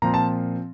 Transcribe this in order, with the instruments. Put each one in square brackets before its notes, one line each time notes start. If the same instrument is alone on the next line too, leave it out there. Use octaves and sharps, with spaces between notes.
[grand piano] A#2 F3 C4 A#5
A5